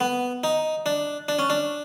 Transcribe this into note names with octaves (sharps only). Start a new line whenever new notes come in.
B3
D#4
D4
D4
C#4
D4